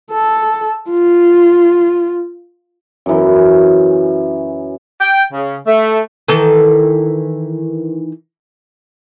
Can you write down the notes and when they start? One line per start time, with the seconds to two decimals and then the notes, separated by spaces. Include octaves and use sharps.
0.12 A4
0.89 F4
3.06 F#2 E3
5.00 G5
5.32 C#3
5.67 A3
6.28 D#3 E3 A4